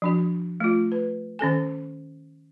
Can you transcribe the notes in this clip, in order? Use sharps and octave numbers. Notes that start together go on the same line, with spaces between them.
F3 D4 F#4
A3 F4
B4
D#3 C#4 A4 G#5